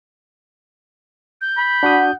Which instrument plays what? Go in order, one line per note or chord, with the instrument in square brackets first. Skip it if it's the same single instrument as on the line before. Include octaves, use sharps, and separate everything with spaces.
[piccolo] G6
[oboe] B5
[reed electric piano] D4 F#4 D#6 [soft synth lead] F#5